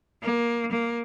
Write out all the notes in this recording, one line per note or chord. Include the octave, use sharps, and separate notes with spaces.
A#3
A#3